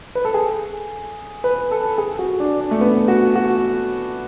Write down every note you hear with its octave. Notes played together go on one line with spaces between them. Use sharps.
B4
A4
G#4
B4
A4
G#4
F#4
D4
D4
A3
B3
F#4
F#4